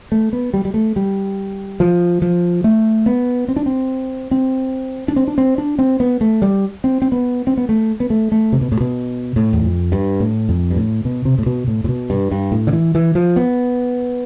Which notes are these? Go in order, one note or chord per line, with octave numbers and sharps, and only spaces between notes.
A3
B3
G3
G3
A3
G3
F3
F3
A3
B3
C4
D4
C4
C4
D4
C4
D4
C4
D4
C4
B3
A3
G3
C4
C4
B3
C4
B3
A3
B3
A3
A3
C3
B2
A2
B2
A2
E2
F2
G2
A2
F2
G2
A2
B2
C3
A2
B2
A2
A2
B2
G2
G2
A2
D3
E3
E3
F3
B3